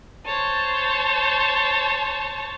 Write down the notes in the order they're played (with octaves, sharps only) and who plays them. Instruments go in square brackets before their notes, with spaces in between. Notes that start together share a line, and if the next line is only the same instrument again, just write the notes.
[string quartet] C5 C#5 A5